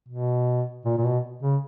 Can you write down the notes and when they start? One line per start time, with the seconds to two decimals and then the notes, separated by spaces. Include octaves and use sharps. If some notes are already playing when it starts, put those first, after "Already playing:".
0.09 B2
0.85 A#2
0.98 A#2
1.04 B2
1.43 C#3